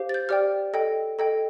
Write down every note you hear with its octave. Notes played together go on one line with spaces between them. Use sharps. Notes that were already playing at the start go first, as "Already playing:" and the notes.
Already playing: G4 C5 F5
A6
G6
G4 D5 G5 F6
A4 D#5 G5
A4 D#5 G5